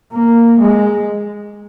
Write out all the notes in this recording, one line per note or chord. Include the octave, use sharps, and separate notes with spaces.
A#3
G#3